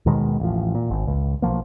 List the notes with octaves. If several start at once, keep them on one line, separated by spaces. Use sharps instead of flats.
D#2 B2 D#3 G#3
A1 F3
A#2
G#1
C#2
B1 F3 A#3